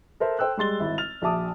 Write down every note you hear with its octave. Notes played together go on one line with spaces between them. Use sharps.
A4 A#4 C5 E5
A4 C5 G5 E6 F#6
G3 G#3 C6 A6 G7
G#1 E4
F6 A6 F7
A#1 F#4 E5 A5 D6 D#6